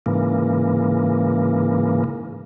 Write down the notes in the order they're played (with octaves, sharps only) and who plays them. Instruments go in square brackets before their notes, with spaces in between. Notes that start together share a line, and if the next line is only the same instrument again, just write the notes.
[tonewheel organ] G#2 C#3 E3 A#3